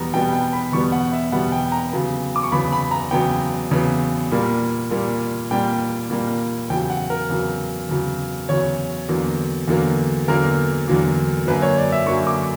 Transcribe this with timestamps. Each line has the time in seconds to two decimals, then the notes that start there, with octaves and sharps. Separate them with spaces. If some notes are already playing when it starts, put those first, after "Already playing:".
Already playing: E2 B2 G3 B3 A#5
0.13 E2 B2 G3 B3 G5
0.33 G5
0.53 B5
0.72 E2 B2 G3 B3 C#6
0.92 F#5
1.13 E5
1.32 E2 B2 G3 B3 F#5
1.52 G5
1.72 A#5
1.93 E2 C#3 F#3 B3
2.36 D6
2.43 C#6
2.52 E2 C#3 F#3 B3 B5
2.72 B5
2.91 A#5
3.11 E2 C#3 F#3 B3 G5
3.71 E2 C#3 F#3 B3
4.31 A#2 G3 A#3
4.91 A#2 G3 A#3
5.51 A#2 G3 A#3 G5
6.10 A#2 G3 A#3
6.70 E2 C#3 F#3 G5
6.90 F#5
7.10 A#4
7.29 E2 C#3 F#3
7.89 E2 C#3 F#3
8.49 E2 C#3 F#3 C#5
9.08 E2 D3 F#3 A#3
9.68 E2 D3 F#3 A#3
10.28 E2 D3 F#3 A#3 A#4
10.88 E2 D3 F#3 A#3
11.47 F#2 D3 F#3 A#3 B4
11.62 C#5
11.78 D5
11.92 E5
12.06 F#2 D3 F#3 A#3 C#6
12.27 D6